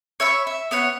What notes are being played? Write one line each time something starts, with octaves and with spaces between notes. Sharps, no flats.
C#5 E5 B5 C#6
E5
B3 C#5 F#5